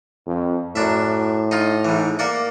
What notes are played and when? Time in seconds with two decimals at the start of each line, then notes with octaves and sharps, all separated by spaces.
0.27 F2
0.75 F#2 A2 D4 E5
1.51 D#4 F4
1.85 G#2 E3
2.19 A#3 D5 F#5